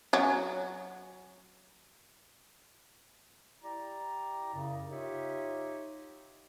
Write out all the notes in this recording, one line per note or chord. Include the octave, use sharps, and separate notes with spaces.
F#3 C#4
E4 G4 D5 A#5
F#2 C#3
D#4 F4 G4 C#5 D#5 E5